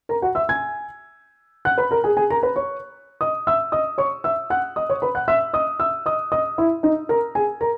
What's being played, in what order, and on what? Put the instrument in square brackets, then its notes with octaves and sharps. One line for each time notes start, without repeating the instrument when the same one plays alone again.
[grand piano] A#4 A#5
F#4 F#5
E5 E6
G#5 G#6
F#5 F#6
B4 B5
A#4 A#5
G#4 G#5
G#4 G#5
A#4 A#5
B4 B5
C#5 C#6
D#5 D#6
E5 E6
D#5 D#6
C#5 C#6
E5 E6
F#5 F#6
D#5 D#6
C#5 C#6
B4 B5
F#5 F#6
E5 E6
D#5 D#6
E5 E6
D#5 D#6
D#5 D#6
E4 E5
D#4 D#5
A#4 A#5
G#4 G#5
A#4 A#5